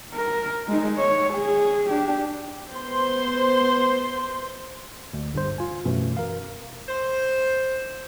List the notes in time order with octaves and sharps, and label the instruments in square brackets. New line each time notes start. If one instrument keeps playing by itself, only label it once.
[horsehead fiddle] A#4
G#3 D#4
C#5
G#4
D4 G4
[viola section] B3 C5 C6
[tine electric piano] D2
G1 G2 C5
F4 G#5
F#2 B2 E3 A3
A#4 F5
[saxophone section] C5